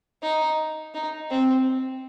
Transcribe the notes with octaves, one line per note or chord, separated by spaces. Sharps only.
D#4
D#4
C4